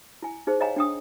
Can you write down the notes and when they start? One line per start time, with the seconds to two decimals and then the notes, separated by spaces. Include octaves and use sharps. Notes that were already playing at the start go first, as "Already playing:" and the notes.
0.22 E4 G#5
0.47 D#4 G#4 C5
0.60 C#5 D#5 F5 G5 G#5 A#5
0.76 D4 G5 D#6